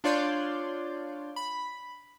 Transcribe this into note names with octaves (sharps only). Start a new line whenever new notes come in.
D4 F4 C#5 D5 C6 G6
B5